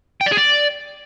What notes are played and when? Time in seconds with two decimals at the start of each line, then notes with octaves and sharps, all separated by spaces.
0.21 G5
0.26 D5
0.32 G#4
0.37 D5